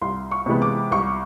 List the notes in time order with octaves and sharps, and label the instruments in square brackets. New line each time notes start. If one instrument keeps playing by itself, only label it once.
[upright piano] C2 C6
C#6
C3 E3 G#3 B3
D6
C2 C#6